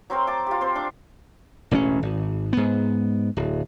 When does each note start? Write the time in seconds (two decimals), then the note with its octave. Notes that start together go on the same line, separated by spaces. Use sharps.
0.10 F#3 C4 A#4 C5
0.27 A5 D6
0.47 F4 G4
0.61 C4 C5
0.75 D4 D6
1.71 E1 A1 C4 C#4
2.03 G#1
2.53 G#2 B3
3.37 D1